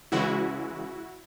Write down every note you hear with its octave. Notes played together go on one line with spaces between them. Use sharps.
C#3 E3 G#3 E4 F#4